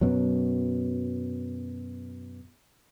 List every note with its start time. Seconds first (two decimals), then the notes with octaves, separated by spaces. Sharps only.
0.01 F#2 B2 F#3